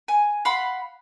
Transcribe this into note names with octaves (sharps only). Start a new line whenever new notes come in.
G#5
F5 F#5 B5 C6